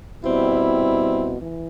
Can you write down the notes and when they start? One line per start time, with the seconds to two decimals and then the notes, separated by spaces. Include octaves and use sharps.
0.21 B2 G3 C4 E4
1.39 E3